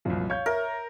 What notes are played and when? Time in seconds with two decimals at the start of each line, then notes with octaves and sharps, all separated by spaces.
0.05 C2 F#2 A#2 F3 F4
0.30 C#5 F5 G6
0.46 A#4 E5